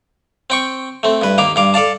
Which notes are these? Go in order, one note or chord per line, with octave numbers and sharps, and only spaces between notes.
C4 G5 C#6
A3 C4
G2 B4
D#2 A#3 F5 D6
G2 F5 D6
A4 D5 F5 A5